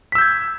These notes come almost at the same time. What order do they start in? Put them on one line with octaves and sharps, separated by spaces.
B6 E6 G6 G#6